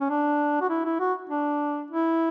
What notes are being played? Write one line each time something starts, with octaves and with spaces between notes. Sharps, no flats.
C#4
D4
F#4
E4
E4
F#4
D4
E4